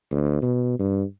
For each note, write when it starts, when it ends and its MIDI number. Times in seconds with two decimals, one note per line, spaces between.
0.12 0.41 38
0.42 0.78 47
0.79 1.03 43